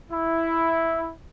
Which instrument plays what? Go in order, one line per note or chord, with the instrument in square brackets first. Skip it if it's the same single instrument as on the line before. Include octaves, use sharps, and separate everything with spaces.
[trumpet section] E4